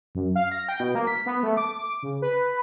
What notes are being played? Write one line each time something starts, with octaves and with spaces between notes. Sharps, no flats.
F#2
F5
A#6
G5
B2
A#3
B6
B3
A3
D6
C#3
B4